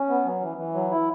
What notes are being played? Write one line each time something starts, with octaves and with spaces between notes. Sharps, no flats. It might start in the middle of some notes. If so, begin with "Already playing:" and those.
Already playing: C#4
B3
F#3
E3
E3
F#3
E4